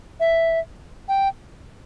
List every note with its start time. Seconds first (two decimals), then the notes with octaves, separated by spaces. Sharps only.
0.20 E5
1.09 G5